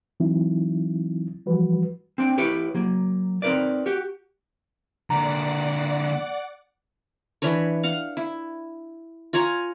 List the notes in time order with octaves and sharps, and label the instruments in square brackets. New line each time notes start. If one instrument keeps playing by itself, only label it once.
[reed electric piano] E3 F#3 C4 D#4 E4
E3 F3 G3 F#4 B4
[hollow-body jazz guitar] C4 D4 G5
E4 G4 B4 C#5
F#3 A#3
C4 D#4 A#4 B4 D5
F#4 G4
[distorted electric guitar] D3 A#3 [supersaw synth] D5 F#5 [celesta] A#5
[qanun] E3 D4 B4 C#5
F5 F#5
E4
F4 C#5 G#5 A#5